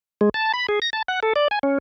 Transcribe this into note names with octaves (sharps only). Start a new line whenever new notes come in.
G#3
A5
B5
G#4
A#6
A5
F#5
A4
D5
G#5
C#4